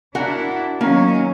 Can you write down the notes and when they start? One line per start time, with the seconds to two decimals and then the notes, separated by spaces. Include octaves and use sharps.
0.15 D4 E4 F#4 A#4 F#5
0.81 D#3 F#3 A#3 C#4